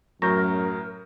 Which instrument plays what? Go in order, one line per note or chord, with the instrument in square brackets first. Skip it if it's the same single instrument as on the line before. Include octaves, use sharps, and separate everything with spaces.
[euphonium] F#2 [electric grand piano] A2 F#3 G6 [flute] A#4 [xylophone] A#5 C#6 A#6